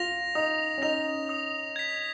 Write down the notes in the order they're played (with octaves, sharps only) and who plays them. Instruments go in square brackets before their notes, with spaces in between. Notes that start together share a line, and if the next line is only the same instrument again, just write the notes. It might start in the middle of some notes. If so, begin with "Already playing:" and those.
Already playing: [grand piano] F4 [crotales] A#6 F7
[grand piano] D#4 [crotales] D#6
[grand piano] C#4
[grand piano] D#4 [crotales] A#6 F7
[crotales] D#6
G#6 B6